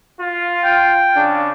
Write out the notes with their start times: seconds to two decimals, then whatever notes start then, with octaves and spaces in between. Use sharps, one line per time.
0.20 F4
0.64 G5
1.16 C#3 D4